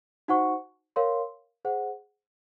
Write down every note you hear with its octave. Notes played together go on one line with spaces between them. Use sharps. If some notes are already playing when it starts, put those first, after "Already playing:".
D#4 F#4 C5 F#5 C#6
A#4 C#5 F5 C6
G#4 C5 F#5